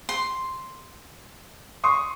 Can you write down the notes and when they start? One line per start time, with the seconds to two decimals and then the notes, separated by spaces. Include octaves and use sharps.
0.09 C6
1.84 C6 C#6 D#6